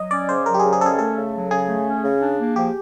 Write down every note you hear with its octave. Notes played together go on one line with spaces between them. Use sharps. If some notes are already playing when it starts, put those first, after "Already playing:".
Already playing: F#3 D#5
C#4 D5
C#3 C5
F#3 A#4
G4
C#3 G#4
G#4
C#4 G#4 A4
A3 A4
C#3
F#3
C#3 G#4
A3
C#4
C#3
D4
A#3
F3 G4